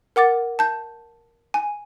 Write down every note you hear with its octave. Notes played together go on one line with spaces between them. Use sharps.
A#4 F#5 D6 A6
A5 G6
G#5